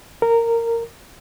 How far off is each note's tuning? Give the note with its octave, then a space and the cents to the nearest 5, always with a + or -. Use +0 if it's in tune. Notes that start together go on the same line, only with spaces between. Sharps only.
A#4 -15